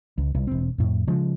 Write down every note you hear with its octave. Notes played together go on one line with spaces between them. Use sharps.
C#2
C2
E1 C4
F2 A2
C#3 F3 G#3